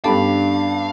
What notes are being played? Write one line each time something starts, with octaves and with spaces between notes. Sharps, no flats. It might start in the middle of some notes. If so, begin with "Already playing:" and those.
G2 B3 C#4 D4 G4 A4 F5 B5